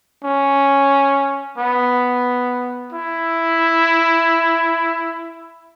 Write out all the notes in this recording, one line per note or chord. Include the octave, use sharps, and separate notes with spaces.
C#4
B3
E4